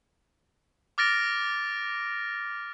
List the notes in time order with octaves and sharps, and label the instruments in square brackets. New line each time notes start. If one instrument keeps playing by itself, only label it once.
[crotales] D6 F6 A6 A#6 D7